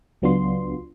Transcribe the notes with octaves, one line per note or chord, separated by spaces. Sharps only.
C#2 F#3 B3 D4 F4 C6